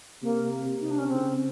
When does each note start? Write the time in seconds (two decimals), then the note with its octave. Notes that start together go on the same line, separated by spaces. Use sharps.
0.22 C3 A#3
0.65 C3
0.81 D#4
0.90 D4
0.98 C#4
1.06 C#3 C4